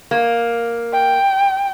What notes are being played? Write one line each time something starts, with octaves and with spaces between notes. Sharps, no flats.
A#3
G5